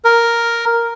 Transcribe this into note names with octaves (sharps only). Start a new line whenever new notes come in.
A#4